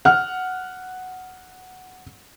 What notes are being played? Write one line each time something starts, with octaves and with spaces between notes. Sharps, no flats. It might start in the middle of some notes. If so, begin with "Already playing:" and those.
F#5 F6